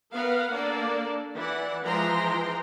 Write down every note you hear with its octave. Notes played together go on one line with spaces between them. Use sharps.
B3 A#4 B4 F5 F#5
A#3 D4 A4 D5
E3 E4 D5 F#5
E3 F3 G#3 G5 A#5 C6